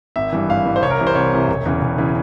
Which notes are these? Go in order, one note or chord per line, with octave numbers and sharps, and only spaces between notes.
G#1 E5
G2 E3
G#1 F5
G2 E3
C5
C2 C#5
A#4
C3 E3
C5
C2 C#5
C3 E3
E1
E2 C#3 E3
E1
C#3 E3